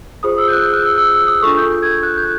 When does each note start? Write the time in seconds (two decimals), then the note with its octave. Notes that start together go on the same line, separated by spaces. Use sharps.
0.23 F4 G#4 C5 D#6
0.38 E6
0.48 G6
0.52 F#6
0.62 G6
0.73 F6
0.83 E6
0.98 E6
1.12 E6
1.27 D#6
1.42 D4 F4 A4 C#6
1.57 G6
1.72 G6
1.82 G#6
1.92 G6
2.03 F#6
2.17 G6